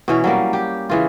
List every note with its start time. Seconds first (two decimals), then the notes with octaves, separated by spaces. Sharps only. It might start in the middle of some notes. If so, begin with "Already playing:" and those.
0.08 B2 E3 C#4
0.24 F#3 G3 A#3
0.53 G4
0.89 C#3 E3 F4